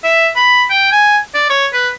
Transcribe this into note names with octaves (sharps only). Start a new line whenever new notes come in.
E5
B5
G5
G#5
D5
C#5
B4